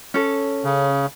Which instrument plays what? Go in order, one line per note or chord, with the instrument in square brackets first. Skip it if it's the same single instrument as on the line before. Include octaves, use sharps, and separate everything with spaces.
[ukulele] C#4 A4
[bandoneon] C#3